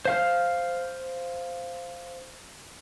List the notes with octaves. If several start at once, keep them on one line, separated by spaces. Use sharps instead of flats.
C5 F5 F6